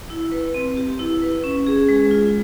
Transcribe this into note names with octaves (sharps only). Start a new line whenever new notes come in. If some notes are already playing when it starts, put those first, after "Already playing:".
E4
B4
C4
G4
E4
B4
C#4
G#4
G#3
F4